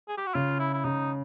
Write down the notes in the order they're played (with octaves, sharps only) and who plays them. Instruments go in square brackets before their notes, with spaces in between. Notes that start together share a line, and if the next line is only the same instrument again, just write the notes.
[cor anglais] G#4
G4
F#4
[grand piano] C#3 [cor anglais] F4
[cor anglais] E4
E4
[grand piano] C#3 [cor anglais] D#4